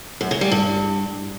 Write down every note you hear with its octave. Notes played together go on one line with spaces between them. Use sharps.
F#2
C#3
G3
G2